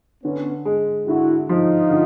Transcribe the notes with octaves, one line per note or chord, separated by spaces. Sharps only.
D3 B3 C#4
G#3
D3 E4 F#4
F3 D#4 F4
D3